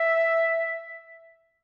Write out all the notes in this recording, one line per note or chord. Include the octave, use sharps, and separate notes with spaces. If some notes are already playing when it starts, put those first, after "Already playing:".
Already playing: E5